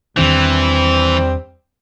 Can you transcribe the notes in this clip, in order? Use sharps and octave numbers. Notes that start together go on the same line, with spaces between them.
E2 D#3 E3 G3 C4 D4